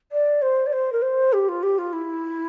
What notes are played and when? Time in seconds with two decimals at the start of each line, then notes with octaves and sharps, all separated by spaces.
0.12 D5
0.42 C5
0.66 D5
0.72 C5
0.92 A#4
1.02 C5
1.33 G4
1.48 F4
1.63 G4
1.78 F4
1.93 E4